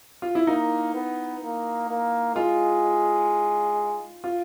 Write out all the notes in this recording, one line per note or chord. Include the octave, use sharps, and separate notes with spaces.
F4
E4
A#3 D#4
B3
A#3
A#3
G#3 F4
F4